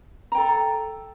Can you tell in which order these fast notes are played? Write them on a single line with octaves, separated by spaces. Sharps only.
A#5 G5 A4